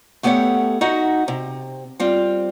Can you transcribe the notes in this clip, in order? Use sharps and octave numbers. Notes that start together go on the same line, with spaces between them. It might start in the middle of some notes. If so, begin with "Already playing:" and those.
A3 B3 G4 A4 C#5 F#5
D#4 F#4 E5 F#5
C3
G3 C4 F4